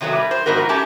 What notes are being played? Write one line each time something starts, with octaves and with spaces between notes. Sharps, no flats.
C3 D#3 F#3 A3 B3
G3
C5
G#2 D#3 B3 F#4 A#4
F3
A3 C#4 G4 A5